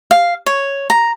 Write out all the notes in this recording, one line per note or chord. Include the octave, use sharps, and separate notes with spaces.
F5
C#5
A#5